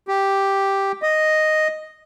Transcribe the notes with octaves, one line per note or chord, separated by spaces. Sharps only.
G4
D#5